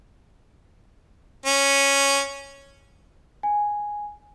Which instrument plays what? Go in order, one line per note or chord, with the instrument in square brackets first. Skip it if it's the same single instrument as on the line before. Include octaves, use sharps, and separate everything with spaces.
[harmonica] C#4
[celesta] G#5